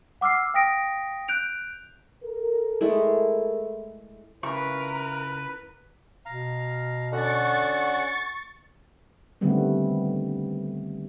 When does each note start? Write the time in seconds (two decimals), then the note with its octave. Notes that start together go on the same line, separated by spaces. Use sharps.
0.21 F#5 D6 E6 F6 C7
0.54 F5 G5 D#6 A#6 B6 D7
1.28 F#6 G6 D7 F7
2.24 A4 A#4
2.81 G#3 A3 E4
4.43 C#3 E4 F4 A#4 B4 C#6
6.26 B2 F5 A#5
7.12 D3 C#4 F#4 F#5 C#6 A6
9.41 D3 D#3 G3 A3 B3 C4